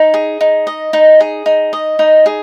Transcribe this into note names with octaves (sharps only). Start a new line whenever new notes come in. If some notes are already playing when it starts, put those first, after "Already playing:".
Already playing: D#4
G#4
D#4
D#5
D#4
G#4
D#4
D#5
D#4
G#4